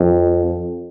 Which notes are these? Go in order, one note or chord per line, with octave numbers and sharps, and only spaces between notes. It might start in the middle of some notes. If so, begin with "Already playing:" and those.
Already playing: F2